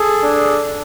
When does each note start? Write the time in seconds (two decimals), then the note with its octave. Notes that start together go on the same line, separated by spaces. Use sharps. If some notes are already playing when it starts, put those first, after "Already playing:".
Already playing: G#4 A4
0.23 D4
0.66 D4